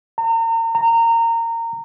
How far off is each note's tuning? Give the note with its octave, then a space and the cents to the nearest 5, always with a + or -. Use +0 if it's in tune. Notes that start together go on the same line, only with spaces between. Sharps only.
A#5 -35
A#5 -20